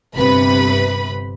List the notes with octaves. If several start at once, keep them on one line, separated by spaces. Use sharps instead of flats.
G1 C3 B4 B5